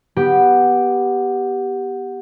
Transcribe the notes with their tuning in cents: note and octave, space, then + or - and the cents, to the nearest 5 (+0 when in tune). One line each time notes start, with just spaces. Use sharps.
B3 -10 G4 +0